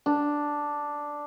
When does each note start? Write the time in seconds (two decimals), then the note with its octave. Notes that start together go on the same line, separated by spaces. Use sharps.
0.06 D4